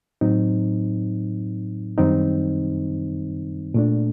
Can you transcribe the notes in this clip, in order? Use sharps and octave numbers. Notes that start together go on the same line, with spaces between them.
A2 F#3 C4 D#4
F#2 D#3 G3 C4 D#4
A#2 A3 D4